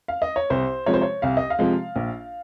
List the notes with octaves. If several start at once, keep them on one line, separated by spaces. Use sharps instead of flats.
F5
D#5
C#5
C2 C5
C3 F3 G#3 C#5
C5
C#5
C2 F5
D#5
F5
C3 F3 G#3
A#1